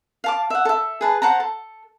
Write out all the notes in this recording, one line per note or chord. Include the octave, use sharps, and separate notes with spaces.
F5 A5 D6
E5 F#5
A4 E5
G#4 B4 A5
C5 F#5 A5 A#5
A4